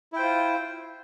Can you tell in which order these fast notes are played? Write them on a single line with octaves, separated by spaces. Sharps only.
E4 G5 C5 F4